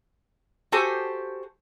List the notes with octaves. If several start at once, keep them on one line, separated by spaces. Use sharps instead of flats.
F#4 G4 A4 C5 G#5